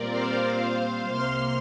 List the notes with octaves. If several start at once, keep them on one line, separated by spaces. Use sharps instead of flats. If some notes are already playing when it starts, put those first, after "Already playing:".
Already playing: A#2 G3 C4 F4 A#4 D5
C5 F5
C2 C3 A#3 C6 F6